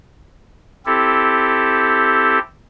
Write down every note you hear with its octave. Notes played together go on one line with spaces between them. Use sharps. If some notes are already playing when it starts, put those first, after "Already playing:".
C4 E4 G4 A4